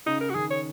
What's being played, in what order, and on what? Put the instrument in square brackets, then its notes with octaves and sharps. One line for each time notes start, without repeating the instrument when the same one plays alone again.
[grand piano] C#3 [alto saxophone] D#4
[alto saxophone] A#4
[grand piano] C#3 [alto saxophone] F#4
[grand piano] D#3 [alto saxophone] G#4
[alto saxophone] C#5